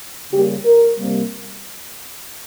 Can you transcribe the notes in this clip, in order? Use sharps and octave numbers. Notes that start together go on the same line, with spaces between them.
C#3 G3 A#3 G4
A#4
C3 G3 A#3